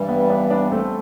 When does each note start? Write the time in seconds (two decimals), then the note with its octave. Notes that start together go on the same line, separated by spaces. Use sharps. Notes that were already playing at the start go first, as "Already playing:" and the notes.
Already playing: G2 E3 G3
0.09 B3
0.29 B3 D4
0.50 B3 D4
0.72 A3 C4